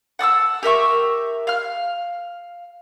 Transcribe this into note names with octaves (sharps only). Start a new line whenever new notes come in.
F#5 A5 D#6 E6
G4 A#4 E5 C#6
F5 F6